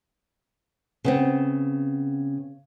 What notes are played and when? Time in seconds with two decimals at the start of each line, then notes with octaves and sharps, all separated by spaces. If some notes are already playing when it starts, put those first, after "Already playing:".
1.04 C#3 B3 C4